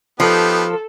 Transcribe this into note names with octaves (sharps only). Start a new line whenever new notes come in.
F3 B3 D#4 G4 A4